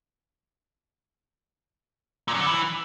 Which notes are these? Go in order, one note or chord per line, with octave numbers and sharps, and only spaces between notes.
A#2
F#2
D3
E3